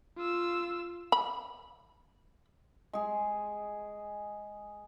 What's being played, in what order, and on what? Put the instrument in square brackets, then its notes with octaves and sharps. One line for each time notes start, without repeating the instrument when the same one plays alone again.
[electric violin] F4 E6
[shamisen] B5
[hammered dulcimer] G#3 G#4